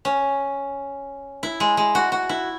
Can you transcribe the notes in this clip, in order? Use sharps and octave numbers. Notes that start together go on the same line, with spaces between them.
C#4
E4
G#3
G#3
F#4
F#4
E4